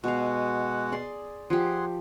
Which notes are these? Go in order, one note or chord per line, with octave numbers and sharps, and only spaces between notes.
B2 G#3 F#4 F5 F#5
G#4 D5 C6
F3 G4 G#4 F#5 C6